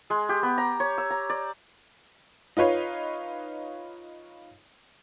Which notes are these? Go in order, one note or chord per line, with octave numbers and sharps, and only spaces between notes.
G#3
G4
B3
A#5
C#5
E6
A#5
D5
D#4 F4 B4 C#5